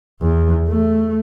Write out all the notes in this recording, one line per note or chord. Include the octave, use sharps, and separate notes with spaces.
E2
A3